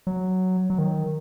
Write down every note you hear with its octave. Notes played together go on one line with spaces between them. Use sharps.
F#3
F#3
D#3